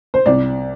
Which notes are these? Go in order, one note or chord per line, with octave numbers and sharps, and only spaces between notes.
C5
C2 D5